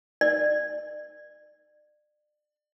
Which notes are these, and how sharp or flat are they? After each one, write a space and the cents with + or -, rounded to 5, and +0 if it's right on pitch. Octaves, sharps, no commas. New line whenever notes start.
D5 +35